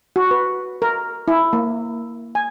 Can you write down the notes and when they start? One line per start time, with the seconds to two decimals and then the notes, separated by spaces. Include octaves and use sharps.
0.16 F#4
0.31 B4
0.82 A#4
1.28 E4
1.53 A#3
2.35 G#5